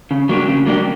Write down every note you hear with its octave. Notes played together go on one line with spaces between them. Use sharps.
C#3
F#3 A#3 D4 G4
C#3
F#3 A#3 D4 G4